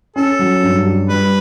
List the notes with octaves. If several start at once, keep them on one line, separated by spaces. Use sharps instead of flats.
C#4 A4
F#3
G2
G4
G3 B4